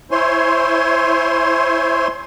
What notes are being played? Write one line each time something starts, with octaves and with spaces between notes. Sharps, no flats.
E4 C5 C#5 G#5 C6